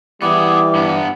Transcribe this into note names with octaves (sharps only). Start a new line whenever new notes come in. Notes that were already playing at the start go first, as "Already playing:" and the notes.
E3 G3 B3 E4 G#4 D6
G2 B3